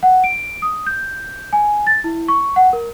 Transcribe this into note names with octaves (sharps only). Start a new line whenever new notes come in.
F#5
D7
D#6
G6
G#5
A6
E4
C#6
F#5
A#4